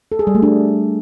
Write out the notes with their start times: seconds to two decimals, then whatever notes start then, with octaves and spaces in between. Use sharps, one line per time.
0.12 A4
0.19 G#4
0.27 G3
0.35 A3
0.42 D4